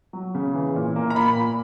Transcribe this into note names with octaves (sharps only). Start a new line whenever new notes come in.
F#3
C#3
E3
A#2
A#3
A#5
A#2 B5
A#2